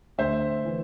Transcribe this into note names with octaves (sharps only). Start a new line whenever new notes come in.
D2 C5 E5
E3